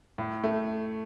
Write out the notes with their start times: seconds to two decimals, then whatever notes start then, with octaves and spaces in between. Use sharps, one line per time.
0.18 A2
0.44 A3